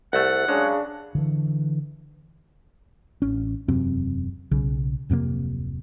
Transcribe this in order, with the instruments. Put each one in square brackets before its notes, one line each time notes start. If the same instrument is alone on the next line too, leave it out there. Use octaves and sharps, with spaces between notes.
[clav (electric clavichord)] C2 A3 [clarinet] F#5
[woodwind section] C#3 [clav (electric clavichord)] F#3 G#3 [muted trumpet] D4
[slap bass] D3 E3
[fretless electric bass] A1 C#4
E1 F#2 C3 C4
B1 C#3
D1 F2 C3 A#3